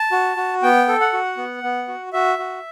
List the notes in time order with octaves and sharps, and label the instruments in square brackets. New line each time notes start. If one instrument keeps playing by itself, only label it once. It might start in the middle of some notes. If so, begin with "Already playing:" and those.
Already playing: [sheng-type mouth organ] A5
F#4
F#4
B3 G5
A4
F#5
F#4
B3
B3
F#4
F#4 E5
F#4